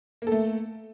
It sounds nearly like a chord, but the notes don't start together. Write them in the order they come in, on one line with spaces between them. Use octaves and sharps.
A#3 A4 A3